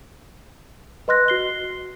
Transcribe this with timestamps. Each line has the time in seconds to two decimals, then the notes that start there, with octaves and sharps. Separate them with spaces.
1.08 B4 D#5 C6 F6 F#6 A#6
1.28 F#4 C7 G7